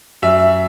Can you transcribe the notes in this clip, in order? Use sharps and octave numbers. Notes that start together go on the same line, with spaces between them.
F#2 E5